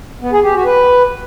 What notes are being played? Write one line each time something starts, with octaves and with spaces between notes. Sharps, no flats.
B3
G#4
G4
F#4
B4